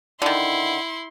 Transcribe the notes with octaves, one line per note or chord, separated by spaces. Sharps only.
D3 D#3 E4 C6